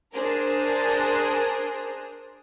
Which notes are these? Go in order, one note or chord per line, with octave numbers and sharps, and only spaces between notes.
D4 G#4 A#4 C5